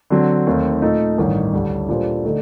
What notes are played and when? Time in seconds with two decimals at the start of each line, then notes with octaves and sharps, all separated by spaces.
0.10 D3 F#3 C4
0.46 D#2 D#3 A3 C4
0.82 A#2 A3 D#4 A4
1.18 A1 G2 D#3
1.53 D2 D3 G3 D4
1.89 A#2 G3 D4 A4 C5
2.25 D3 A3 D#4 A4